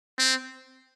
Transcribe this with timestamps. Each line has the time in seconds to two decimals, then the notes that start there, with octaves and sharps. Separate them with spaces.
0.18 C4